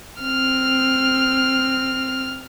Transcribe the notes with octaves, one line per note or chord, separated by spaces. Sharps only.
C4 F6